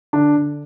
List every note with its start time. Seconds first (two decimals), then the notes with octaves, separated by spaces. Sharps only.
0.13 D3 D4
0.35 D3